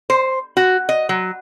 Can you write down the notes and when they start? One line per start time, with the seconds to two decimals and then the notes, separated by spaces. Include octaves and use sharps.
0.10 C5
0.57 F#4
0.89 D#5
1.09 F#3